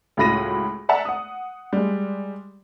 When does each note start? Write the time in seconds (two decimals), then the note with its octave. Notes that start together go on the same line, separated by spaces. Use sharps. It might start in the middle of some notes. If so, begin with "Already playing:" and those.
0.17 C#2 A2 F#4 B5 A#6 D#7
0.89 D5 E5 F#5 A5 A#5
1.05 F#5 D#6
1.73 G3 G#3